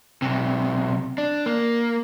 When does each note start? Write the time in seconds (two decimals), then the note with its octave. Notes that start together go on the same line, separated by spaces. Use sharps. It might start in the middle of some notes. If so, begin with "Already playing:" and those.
0.22 B1 C3
1.18 D4
1.46 A#3